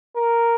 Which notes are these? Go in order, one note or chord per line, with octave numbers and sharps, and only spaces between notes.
A#4